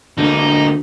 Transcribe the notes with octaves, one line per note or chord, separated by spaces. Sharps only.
D2 D3 A#3 D4 D#4